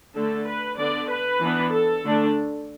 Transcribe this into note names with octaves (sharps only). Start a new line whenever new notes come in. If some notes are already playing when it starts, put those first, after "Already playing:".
D3 A3 D4 A4
B4
D3 B3 D4 D5
B4
E3 B3 D4
A4
D3 A3 D4